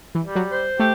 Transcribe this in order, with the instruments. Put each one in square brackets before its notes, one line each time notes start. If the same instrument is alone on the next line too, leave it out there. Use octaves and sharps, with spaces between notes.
[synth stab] E3
[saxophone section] G3
[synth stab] F#3
[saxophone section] C5
[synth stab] A3 [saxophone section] G4